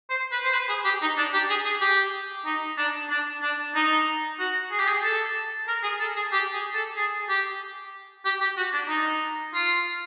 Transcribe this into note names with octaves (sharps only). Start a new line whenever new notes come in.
C5
B4
C5
B4
G#4
G4
D#4
D4
G4
G#4
G#4
G4
D#4
D4
D4
D4
D#4
F#4
G#4
G4
G#4
A4
A#4
G#4
A4
G#4
G4
G#4
A4
G#4
G4
G4
G4
F#4
D4
D#4
F4